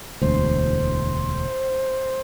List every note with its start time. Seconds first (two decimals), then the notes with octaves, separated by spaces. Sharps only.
0.22 E1 D2 C5